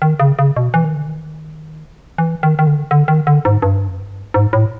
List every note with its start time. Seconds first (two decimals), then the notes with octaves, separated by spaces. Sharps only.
0.02 D#3
0.20 C#3
0.39 C#3
0.57 B2
0.74 E3
0.84 D#3
0.94 D3
1.05 D#3
2.18 E3
2.43 D#3
2.59 D#3
2.67 D3
2.91 D3
3.08 D#3
3.27 D3
3.45 G#2
3.62 G2
3.88 F#2
3.99 G2
4.34 G#2
4.53 A2